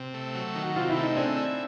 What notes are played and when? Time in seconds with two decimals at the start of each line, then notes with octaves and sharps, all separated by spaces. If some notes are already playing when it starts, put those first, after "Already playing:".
Already playing: C3
0.14 A3
0.35 F#3
0.55 D#3
0.63 F#4
0.76 C3 F4
0.90 E4
0.96 A3
1.03 D#4
1.17 C4 D4 G#4
1.37 E4